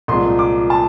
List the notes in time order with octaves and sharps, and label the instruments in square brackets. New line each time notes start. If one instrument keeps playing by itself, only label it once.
[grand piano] C2 A#2 F3 G#3 C6
D6
A5